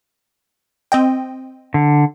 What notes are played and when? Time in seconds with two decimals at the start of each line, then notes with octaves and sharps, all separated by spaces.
0.92 C4 D#5 G5
1.74 D3